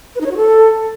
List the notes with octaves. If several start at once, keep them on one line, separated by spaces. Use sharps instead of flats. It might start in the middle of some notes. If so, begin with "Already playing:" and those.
B4
D#4
C#5
F#4
A4